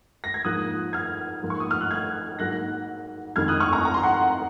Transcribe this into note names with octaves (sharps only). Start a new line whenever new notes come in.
A#6
G#6
G#2 F3 A#3 D#6 F#6
F6 G#6
G#2 F3 A#3
C#6
D#6
F6
F#6
F6 G#6
G#2 F#3 A#3 F#6 A#6
F2 D#3 G#3 F6 G#6
D#6 F#6
C#6 F6
A#5 C#6
A#5
C6
F#5 A#5